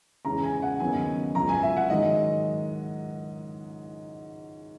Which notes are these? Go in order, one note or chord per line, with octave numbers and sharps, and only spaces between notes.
E2 C#3 G#3 C#4 E4 A#5
G#5
F#5
D#2 C#3 F#3 B3 D#4 G#5
C#2 C#3 F#3 A#5
G#5
E5
F#5
G#2 D#3 F#3 D#5